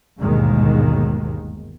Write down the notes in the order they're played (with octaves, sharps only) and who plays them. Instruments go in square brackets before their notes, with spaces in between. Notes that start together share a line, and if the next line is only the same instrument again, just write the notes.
[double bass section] G1 D#2 G#2 B2 D#3 G#3